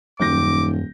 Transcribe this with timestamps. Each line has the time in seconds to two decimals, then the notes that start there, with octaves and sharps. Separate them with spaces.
0.20 D#1 F#2 D#3 D6 G6 A#6